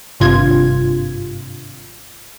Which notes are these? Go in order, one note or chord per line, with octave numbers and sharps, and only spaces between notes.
G#1 G2 C3 F4 G#6